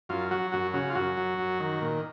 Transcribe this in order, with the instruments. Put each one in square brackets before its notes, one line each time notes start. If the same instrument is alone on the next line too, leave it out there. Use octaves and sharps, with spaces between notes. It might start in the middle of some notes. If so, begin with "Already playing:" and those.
[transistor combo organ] F#2 F4
F#3 F#4
F#2 F#4
C#3 F#4
F4
F#2 F#4
F#3
F#2
D#3
A#2